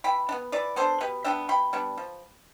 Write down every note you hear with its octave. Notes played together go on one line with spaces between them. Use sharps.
E3 G5 B5
D4
B3
E3 B4 D5
B3 D4 A4 C5
B2 G4 B4
G3 B3 D4 E5 G5
B2 G5 B5
G3 B3 D4
F3